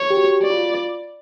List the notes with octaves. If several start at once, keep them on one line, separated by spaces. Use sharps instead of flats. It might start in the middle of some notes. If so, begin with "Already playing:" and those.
Already playing: C#5
G4
F#4
D5
F4